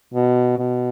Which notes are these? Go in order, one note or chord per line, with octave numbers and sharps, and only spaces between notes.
B2
B2